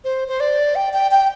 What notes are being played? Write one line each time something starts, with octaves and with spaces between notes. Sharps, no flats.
C5
C5
D5
G5
G5
G5